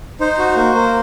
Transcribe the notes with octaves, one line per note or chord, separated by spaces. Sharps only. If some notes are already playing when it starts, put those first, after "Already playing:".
D#4 C5
F#4
A#3
A#3